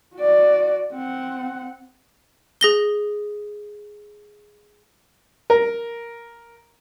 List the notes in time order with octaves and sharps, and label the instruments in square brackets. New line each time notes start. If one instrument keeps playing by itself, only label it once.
[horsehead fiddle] F#4 D5
C4 F#5
[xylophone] G#4 A#6 G7
[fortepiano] A#4